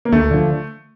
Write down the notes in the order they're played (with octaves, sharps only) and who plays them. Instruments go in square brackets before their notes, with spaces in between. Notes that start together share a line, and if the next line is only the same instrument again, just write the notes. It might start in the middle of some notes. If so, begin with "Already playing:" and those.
[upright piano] A#3
[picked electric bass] D2 [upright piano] A3
[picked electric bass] D3 F3